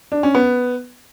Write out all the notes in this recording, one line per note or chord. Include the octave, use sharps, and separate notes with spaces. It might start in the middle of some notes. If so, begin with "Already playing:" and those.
D4
C#4
B3